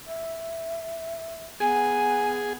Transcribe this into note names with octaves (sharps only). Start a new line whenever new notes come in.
E5
B3 G#4 G#5